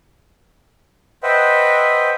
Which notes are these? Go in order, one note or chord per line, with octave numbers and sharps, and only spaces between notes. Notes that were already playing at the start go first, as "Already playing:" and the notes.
B4 C5 D#5 E5 F#5 G5